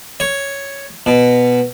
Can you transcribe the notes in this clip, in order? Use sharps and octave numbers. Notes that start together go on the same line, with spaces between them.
C#5
B2